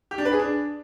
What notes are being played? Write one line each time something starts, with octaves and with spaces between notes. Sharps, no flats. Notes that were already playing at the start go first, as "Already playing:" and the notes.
G4
D4
B4
G#4
D4